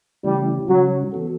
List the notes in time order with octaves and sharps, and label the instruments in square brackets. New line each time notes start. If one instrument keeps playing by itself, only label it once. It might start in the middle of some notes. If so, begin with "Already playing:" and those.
[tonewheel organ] C#3 E3 A3 C#4 E4 [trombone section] G3
[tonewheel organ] C#3 G3 C#4 F#4 [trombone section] F#3
[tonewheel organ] E3 B3 F#4 A4